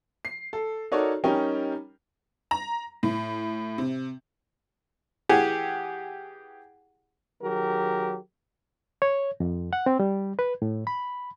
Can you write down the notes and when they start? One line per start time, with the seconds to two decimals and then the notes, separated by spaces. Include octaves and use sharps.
0.25 C7
0.53 A4
0.92 D#4 F#4 A4 A#4 C#5 D5
1.24 G3 C#4 D#4 A#4 G5
2.51 A#5
3.03 A2
3.78 C3
5.29 E3 G4 G#4 F#5 G#5
7.42 D#3 F#3 G4 G#4 A#4
9.02 C#5
9.40 F2
9.73 F#5
9.86 C4
10.00 G3
10.39 B4
10.62 A2
10.87 B5